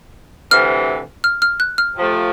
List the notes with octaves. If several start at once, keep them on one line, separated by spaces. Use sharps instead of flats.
D2 C3 E3 F6
F6
F6
F#6
F6
C3 F3 A3